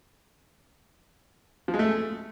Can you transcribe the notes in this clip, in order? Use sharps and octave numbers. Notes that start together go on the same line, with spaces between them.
F3
G#3
A3